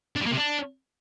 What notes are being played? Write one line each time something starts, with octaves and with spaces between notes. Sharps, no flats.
D4
G3
A#3
C3
D4